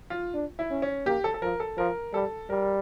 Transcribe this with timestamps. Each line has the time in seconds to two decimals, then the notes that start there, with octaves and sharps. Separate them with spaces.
0.10 F4
0.34 D4
0.59 E4
0.71 C#4
0.82 C#4
1.06 A#3 G4
1.24 A4
1.34 A4
1.42 F3 A#4
1.60 A4
1.78 F3 A#4
2.14 G3 A4
2.50 G3 A#4